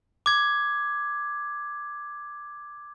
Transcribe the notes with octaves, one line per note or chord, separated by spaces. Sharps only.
D6 G#6